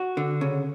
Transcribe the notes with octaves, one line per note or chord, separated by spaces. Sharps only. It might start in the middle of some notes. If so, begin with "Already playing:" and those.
Already playing: F#4
D3
C#3